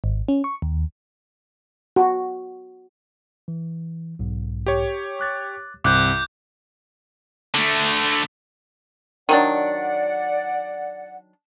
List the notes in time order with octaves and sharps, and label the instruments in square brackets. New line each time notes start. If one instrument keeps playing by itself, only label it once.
[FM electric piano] G#1
C#4
C#6
D#2
[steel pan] F#4
[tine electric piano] E3
B1 G#2
[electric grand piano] G4 C#5
[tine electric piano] D6 F#6 A6
[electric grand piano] C2 [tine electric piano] G2 C4 [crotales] D6 F#6 G6
[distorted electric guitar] D3 A3
[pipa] D#3 F#3 D4 [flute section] D5 F#5